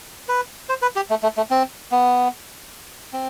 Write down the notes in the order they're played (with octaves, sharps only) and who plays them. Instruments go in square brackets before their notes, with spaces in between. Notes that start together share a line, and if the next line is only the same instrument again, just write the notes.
[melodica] B4
C5
B4
G4
A3
A3
A3
C4
B3
C4